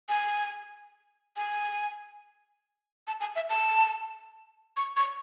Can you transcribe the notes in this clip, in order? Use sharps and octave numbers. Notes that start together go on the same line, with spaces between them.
G#5
G#5
A5
G#5
E5
A5
C#6
C#6